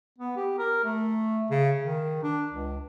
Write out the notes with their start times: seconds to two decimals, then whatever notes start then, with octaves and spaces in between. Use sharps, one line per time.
0.18 B3
0.37 G4
0.58 A#4
0.84 A3
1.51 C#3
1.83 D#3
2.23 D4
2.51 C#2